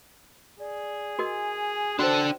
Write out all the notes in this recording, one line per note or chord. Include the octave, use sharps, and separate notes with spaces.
G#4 D5
F#4 A#4 D#5 G#5
D4 F#4 A4 C5 F#5 G5